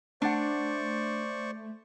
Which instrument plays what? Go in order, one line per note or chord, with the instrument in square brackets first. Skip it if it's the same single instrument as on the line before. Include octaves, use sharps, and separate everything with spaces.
[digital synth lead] A3 [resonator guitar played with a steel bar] D4 F#5 [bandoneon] C5 D5 C#6